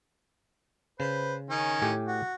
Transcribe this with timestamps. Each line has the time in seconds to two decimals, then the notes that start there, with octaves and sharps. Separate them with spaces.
1.00 C#3 B4 C5
1.50 D#3 C#4
1.82 A2 G4 G#5
2.08 F#4